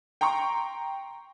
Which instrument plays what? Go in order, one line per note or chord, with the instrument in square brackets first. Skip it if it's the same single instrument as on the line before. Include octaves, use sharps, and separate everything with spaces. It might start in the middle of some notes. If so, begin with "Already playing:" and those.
[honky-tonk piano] G5 A#5 C6 C#6